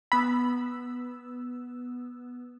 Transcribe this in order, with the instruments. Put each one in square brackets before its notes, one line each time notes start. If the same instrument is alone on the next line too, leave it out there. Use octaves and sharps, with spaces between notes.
[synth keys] B3 E6 [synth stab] B5